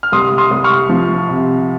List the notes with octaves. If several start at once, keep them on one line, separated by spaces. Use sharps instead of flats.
F6
C2 C6 D#6
C6 D#6
C2
C#6 F6
F3
C3